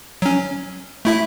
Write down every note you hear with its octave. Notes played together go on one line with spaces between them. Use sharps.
F#3 C#4
A3 E4 E5